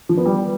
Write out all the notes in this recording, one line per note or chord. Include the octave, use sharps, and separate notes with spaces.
F3
B3
G3